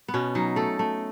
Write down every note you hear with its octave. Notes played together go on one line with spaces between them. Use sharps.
B3
B2 C#4
F#3 D#4
A3 A4
A3